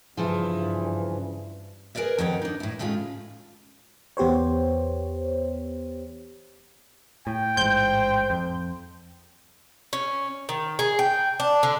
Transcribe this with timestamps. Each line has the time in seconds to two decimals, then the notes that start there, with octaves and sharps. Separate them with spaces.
0.17 G2 C#3 E3 F3
1.95 G#4 A#4 B4 D5 E5
2.18 F2 D#3 F4 C#5 F#5 G5
2.42 D4 D#4
2.60 A2 E4
2.79 A2 D#3 G#3 C#4 F4
4.17 E2 B3 G4 C5 C#5
7.27 A2 G5
7.57 A1 G#2 C5 G6
8.30 F2
9.93 C#4
10.49 D#3
10.79 G#4
10.99 G5
11.40 D4
11.63 D3